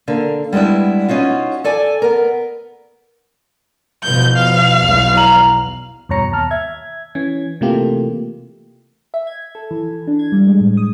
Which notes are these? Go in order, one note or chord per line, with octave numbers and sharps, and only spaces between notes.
D3 A#3
G3 G#3 B3 D4 E4
C#4 D#4 F4 F#4
A4 D5 G#5
B3 A#4
E2 B2 F3 G6
F5
B1 E2
A#5 F#7
E2 G2 B2 C#5 A#5 C#7
D#2 A5 F6
E5 G#6
E3 C#4 G#6
C3 E3 A3 A#3 F4 G4
E5
G#6
A4
E3
E3
D4
G#6
G3
G#3
A2
D#6